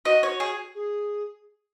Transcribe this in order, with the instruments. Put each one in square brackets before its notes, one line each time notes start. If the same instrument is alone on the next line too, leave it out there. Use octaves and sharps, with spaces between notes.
[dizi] F#4 [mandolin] D#5
[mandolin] C#5
G#4
[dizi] G#4